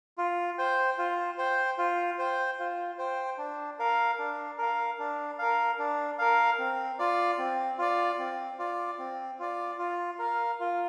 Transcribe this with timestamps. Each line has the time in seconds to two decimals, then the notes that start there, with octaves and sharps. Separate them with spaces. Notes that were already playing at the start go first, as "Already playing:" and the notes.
0.18 F4
0.58 C5 G5
0.98 F4
1.38 C5 G5
1.78 F4
2.19 C5 G5
2.59 F4
2.98 C5 G5
3.38 D4
3.79 A#4 F5
4.19 D4
4.58 A#4 F5
4.99 D4
5.39 A#4 F5
5.79 D4
6.18 A#4 F5
6.59 C4
6.99 F4 D5
7.38 C4
7.78 F4 D5
8.18 C4
8.59 F4 D5
8.99 C4
9.39 F4 D5
9.78 F4
10.19 A#4 F5
10.60 F4